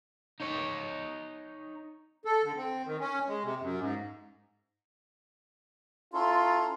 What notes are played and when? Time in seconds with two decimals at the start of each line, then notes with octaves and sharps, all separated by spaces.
0.40 D#4 C#5
2.25 A4
2.43 D3
2.57 C4
2.86 D#3
3.00 C#4
3.28 G#3
3.44 C3
3.61 F#2
3.80 G#2
6.13 C#4 E4 F4 A4 A#5 C6